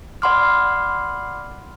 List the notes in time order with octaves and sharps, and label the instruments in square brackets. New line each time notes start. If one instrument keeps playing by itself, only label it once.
[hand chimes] D5 F#5 B5 C6 D6 F6